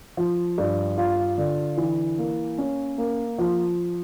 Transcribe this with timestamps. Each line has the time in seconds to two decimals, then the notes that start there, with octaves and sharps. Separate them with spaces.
0.17 F3
0.58 G2
0.98 F4
1.38 D3
1.78 E3
2.18 A#3
2.58 C#4
2.98 A#3
3.39 F3